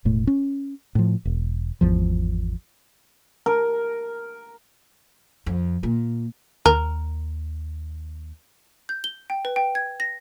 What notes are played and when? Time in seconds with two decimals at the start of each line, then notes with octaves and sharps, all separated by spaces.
0.05 E1 A2 A3
0.27 C#4
0.95 A2 F3
1.25 E1
1.81 G#1 E2 F3
3.46 A#4
5.46 F2
5.83 A#2
6.66 D#2 A#4
8.89 G6
9.04 G7
9.30 G5
9.45 B4
9.56 G5
9.75 G#6
10.00 A#6